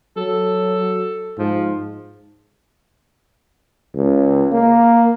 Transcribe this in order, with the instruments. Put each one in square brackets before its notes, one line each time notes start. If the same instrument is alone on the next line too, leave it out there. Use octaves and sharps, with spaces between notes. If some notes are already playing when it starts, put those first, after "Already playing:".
[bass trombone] F#3 [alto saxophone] A4
[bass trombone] G#2 [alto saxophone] F3
[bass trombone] C#2
A#3